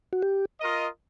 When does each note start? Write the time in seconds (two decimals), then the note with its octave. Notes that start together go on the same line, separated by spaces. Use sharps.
0.13 F#4
0.22 G4
0.61 F4 A#4 D#5